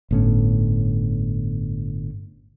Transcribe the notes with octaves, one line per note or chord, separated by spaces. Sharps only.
G1 A2 C#4